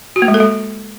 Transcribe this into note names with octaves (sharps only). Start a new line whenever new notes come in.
F#4
A#3
G#3
A4
G#3